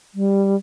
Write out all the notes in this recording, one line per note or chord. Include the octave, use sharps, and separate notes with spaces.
G3